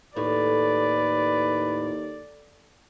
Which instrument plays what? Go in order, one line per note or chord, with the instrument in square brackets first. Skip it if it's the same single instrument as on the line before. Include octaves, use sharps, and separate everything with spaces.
[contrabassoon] D#2 [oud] A2 [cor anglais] B4 [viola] D5